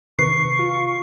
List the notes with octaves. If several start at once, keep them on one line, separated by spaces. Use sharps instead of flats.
C3 D#3 B4 C#6 C7
F4